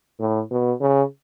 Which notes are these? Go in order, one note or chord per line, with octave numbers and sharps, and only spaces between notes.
A2
B2
C#3